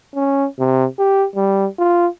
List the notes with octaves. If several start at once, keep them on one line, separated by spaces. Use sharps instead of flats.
C#4
C3
G4
G3
F4